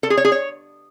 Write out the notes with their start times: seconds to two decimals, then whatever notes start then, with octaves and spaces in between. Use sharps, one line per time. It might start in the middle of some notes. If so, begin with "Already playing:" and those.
0.03 A4
0.10 G#4
0.17 C#5
0.25 G#4
0.32 C#5